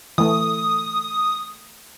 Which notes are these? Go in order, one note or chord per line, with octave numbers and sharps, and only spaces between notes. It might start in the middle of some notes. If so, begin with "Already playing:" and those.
E3 A3 D#6